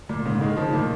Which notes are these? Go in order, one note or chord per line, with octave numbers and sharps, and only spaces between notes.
A#2
G#2 C#3
D#3 G#3
C#3 F3
A#2 D#3